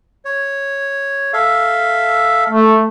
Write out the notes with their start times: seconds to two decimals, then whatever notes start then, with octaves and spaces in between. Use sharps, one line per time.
0.25 C#5
1.33 A4 E5 F5
2.50 A3